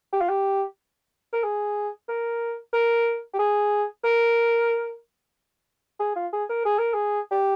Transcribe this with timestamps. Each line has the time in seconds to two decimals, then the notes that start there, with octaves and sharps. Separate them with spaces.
0.13 G4
0.21 F4
0.29 G4
1.33 A#4
1.44 G#4
2.09 A#4
2.73 A#4
3.34 G4
3.39 G#4
4.04 A#4
6.00 G#4
6.16 F4
6.33 G#4
6.49 A#4
6.65 G#4
6.79 A#4
6.94 G#4
7.31 G4